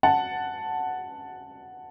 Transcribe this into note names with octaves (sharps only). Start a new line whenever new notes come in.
F#5 A5